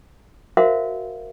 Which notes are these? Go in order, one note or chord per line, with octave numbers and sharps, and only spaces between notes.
F#4 A#4 C5 E5 F5